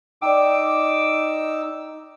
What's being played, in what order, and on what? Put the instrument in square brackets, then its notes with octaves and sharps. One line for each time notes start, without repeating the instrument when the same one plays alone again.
[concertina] D#4 E6 [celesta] D5 G5 [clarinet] D6